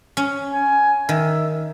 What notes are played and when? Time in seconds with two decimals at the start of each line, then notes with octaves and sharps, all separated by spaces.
0.17 C#4
0.53 G#5
1.09 D#3 E5